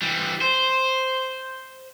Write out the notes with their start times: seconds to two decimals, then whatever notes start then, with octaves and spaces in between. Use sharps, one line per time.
0.02 E3 G3
0.41 C5